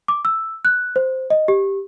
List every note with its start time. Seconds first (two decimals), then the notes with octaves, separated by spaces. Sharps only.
0.08 D6
0.25 E6
0.65 F#6
0.96 C5
1.30 D#5
1.48 G4